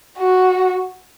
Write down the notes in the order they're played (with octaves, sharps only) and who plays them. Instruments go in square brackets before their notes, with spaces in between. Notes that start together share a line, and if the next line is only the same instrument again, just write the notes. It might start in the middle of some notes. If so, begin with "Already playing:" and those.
[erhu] F#4